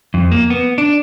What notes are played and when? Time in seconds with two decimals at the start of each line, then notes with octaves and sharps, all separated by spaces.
0.14 F2
0.32 A#3
0.50 B3
0.78 D4